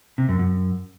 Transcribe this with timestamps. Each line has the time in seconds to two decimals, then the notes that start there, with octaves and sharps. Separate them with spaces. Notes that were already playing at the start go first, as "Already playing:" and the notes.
0.18 C3
0.29 F#2
0.39 F#2